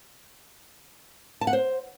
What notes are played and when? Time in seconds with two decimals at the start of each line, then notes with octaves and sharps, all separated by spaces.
1.41 A5
1.47 F#5
1.53 C5